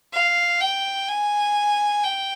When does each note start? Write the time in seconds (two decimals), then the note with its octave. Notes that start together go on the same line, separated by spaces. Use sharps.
0.14 F5
0.61 G5
1.08 G#5
2.04 G5